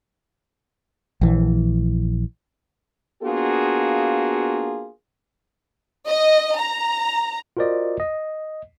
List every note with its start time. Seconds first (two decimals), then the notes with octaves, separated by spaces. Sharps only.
1.21 A#1 E3
3.23 A#3 B3 D4 F4 F#4 G#4
6.07 D#5
6.57 A#5
7.57 F4 F#4 A#4 C5 D5 D#5
8.00 D#5